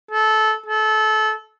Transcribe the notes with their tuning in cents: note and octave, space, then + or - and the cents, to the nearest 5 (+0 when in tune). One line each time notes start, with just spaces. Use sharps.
A4 -20
A4 -25